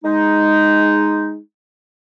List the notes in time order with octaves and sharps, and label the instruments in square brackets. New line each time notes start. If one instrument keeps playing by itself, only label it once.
[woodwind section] G#3 D#4